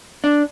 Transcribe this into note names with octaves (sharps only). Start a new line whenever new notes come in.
D4